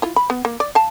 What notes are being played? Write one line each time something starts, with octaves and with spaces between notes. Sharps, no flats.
E4 F4
B5
B3
A#3
D5
F5 A5